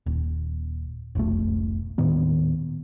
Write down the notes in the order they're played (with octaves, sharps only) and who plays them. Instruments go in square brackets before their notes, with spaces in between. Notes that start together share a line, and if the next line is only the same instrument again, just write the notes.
[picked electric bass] D#1
F1 B1 A3
D#1 A2 D#3 B3